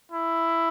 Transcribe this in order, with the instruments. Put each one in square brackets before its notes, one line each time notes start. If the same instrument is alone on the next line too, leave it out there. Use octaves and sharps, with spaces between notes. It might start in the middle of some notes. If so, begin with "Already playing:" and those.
[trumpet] E4